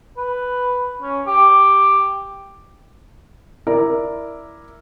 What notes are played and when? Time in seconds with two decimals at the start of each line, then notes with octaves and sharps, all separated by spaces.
0.18 B4
1.02 C#4
1.27 G4
3.67 E4 A#4 D5